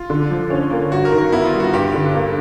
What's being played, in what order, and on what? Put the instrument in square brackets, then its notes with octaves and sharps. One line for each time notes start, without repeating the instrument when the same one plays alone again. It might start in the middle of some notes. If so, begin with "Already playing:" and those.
Already playing: [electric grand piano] F4
[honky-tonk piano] D3
F3
C#4
A#3
[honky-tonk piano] G2 [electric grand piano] F#4
[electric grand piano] A#4
[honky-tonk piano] D#3
[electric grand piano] A#4
[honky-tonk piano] B3 [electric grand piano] E4
[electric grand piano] F4
[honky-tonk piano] G3
[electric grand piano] F#4
[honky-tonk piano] G2 [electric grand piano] G4
[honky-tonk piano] D3
A#3